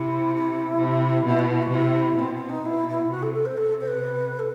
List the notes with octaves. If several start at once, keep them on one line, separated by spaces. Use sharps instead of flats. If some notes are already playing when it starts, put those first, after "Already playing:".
Already playing: C3 E4
E4
C3
B2 E4
F#4
E4
F#4
C3 E4
B2 C4
C4
D#4
B2 E4
E4
C3 F#4
A4
A4
C5
C3 A4
C5
B4
A4